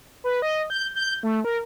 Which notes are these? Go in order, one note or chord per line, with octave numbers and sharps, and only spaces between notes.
B4
D#5
G6
G6
A3
A#4